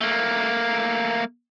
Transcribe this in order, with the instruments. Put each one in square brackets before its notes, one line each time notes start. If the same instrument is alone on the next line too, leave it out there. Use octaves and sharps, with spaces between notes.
[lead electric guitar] A3 A#3